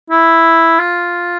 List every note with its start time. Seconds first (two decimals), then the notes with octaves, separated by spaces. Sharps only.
0.11 E4
0.79 F4